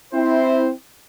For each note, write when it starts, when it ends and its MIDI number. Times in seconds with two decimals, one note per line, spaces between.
0.14 0.71 60
0.14 0.71 64
0.14 0.71 72